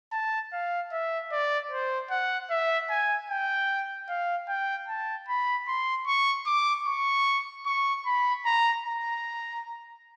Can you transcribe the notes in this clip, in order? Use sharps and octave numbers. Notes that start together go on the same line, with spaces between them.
A5
F5
E5
D5
C5
F#5
E5
G#5
G5
F5
G5
A5
B5
C6
C#6
D6
C#6
C#6
B5
A#5
A#5